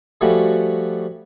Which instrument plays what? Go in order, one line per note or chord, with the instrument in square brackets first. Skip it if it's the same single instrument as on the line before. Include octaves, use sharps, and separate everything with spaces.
[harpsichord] F3 G3 A3 C#4 F#4